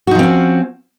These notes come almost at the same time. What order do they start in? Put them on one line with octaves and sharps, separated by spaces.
F#4 D#4 F3 C4 C#4